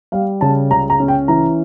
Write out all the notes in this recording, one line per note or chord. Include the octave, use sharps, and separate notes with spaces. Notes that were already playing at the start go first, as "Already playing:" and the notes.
G3 F5
C#3 A5
C#2 A#5
A#5
C#4
G5
E3 A#5